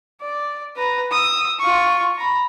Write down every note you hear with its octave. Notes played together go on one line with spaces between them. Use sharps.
D5
B4 A#5
D#6 E6
F4 C#6
A#5 B5